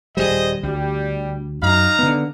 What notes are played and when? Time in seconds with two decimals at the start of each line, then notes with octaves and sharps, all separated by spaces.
0.17 D#1 B1 G3 G#4 C5 D#5
0.63 D2 G3
1.63 F#2 D#4 F5 A#5
1.99 D3 B3